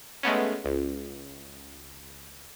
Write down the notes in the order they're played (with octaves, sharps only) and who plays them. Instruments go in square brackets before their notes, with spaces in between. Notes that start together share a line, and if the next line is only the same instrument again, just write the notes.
[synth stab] G#3 A3 B3 C#4
C#2